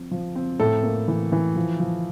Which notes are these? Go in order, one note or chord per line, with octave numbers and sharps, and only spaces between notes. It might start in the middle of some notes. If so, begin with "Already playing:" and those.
Already playing: F3 C4
F3
C4
A2 A4
A#3
E3
E3
F3
F3